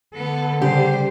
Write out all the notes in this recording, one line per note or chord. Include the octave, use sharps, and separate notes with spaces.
D3 B3 A4
C#3 G3 G4 C5